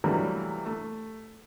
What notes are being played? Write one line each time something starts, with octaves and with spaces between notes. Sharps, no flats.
C3 E3 F#3 G3 A3 A#3
A3